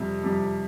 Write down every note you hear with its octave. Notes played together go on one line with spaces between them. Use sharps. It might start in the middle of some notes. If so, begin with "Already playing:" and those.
Already playing: F2 C3 G3
F2 C3 G3